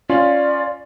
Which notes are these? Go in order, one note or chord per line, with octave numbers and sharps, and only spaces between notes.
C#4 F4 D5